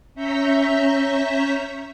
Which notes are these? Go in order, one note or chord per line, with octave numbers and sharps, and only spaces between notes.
C#4 E5 A#5 C#6 G6 B6